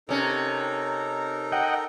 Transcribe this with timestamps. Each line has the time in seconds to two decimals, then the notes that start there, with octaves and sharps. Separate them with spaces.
0.09 C3 C#4 D#4 A4 A#4
1.52 D#5 F#5 G5